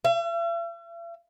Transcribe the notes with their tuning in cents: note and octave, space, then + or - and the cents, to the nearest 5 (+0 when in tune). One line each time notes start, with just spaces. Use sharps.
E5 +45